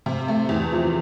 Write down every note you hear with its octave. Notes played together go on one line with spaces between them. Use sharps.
C3
A3
E2
F3